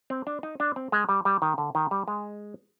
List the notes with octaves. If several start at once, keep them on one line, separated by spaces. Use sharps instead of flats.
C4
D4
D#4
D4
C4
G#3
G3
G3
D#3
D3
D#3
G3
G#3